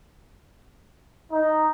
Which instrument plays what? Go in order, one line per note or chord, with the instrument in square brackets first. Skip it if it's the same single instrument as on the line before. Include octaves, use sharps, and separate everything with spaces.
[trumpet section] D#4